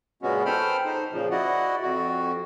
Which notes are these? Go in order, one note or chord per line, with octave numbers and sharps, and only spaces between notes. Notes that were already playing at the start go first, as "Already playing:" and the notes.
A#2 C#3 G#3 B3 C#4 F#4
A4 C5 G5 B5 F6
D#4 C5
A#2 C#3 F3
E4 F#4 D5 D#5 F#5
F2 F#4